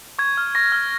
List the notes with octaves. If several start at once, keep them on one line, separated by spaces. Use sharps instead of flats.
C#6 G#6
F6
C#6 A#6
F6